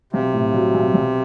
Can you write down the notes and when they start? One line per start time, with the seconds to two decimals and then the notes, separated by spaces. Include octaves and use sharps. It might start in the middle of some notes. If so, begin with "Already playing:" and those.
0.13 B1 C3
0.33 A2
0.54 F#3
0.74 B1
0.94 B1